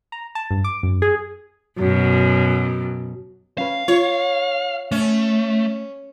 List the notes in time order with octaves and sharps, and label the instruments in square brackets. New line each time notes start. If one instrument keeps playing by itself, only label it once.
[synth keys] A#5
A5
G2
D6
F#2
G#4
[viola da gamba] F#2 B2
[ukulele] C#4 B4 [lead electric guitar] F5
[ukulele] F4 [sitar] C#5
[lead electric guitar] A3 [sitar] C#4